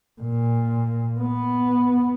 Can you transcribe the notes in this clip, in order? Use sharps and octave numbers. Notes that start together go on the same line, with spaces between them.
A#2
B3